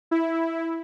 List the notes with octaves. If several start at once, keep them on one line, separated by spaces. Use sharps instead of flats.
E4